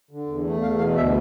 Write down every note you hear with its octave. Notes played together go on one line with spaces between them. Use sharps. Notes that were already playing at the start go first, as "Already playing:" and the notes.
D3
E2
A3
E2 F5
B2 F5
D2 E5